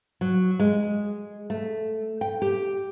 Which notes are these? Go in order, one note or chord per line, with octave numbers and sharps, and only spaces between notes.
F#3
G#3
A3
G5
G4